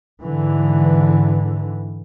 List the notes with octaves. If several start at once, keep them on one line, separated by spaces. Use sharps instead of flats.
G#2 D3 E3